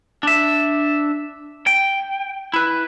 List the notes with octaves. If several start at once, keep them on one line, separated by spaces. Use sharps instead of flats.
D4 E5
G5
E4 B4